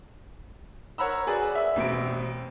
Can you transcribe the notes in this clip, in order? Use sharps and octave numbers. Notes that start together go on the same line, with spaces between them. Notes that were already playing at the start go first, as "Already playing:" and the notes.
A#4 C#5 F#5 A#5 B5 E6
F#4 G#4 B4 D5
E5
A1 B2 C4 D7